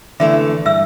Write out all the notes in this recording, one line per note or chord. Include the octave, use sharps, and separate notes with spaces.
D3 E3 A3 E5
G2 E5 E6